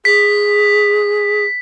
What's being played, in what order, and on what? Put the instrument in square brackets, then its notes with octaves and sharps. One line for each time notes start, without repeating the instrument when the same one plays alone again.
[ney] G#4 [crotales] B6